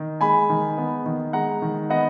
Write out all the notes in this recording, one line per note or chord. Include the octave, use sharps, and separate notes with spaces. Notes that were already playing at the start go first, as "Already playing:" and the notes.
Already playing: D#3
G#3 G#5 B5
D#3
B3
D#3
G#3 F#5 A#5
D#3
B3 D#5 F#5